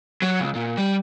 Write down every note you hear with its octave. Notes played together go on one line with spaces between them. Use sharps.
F#3
C#2
A#2
G3